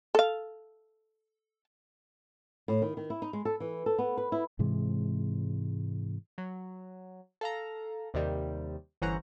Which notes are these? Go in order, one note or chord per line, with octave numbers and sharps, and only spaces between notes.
A4 F5
A2
D#3
D#3
E4
D#4
G#3
A4
E3
A4
B3
B4
E4
G#2 C3 E3 G#3
F#3
A4 F5 A#5
D#2 C3 D#3 G3
G1 E3 C#4 C5 F#5 A#5